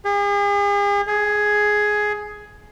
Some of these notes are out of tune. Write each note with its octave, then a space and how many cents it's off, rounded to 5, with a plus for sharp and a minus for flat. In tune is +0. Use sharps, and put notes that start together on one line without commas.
G#4 -40
G#4 +10